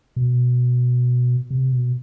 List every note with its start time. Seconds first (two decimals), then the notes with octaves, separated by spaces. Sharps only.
0.16 B2
1.50 C3
1.72 B2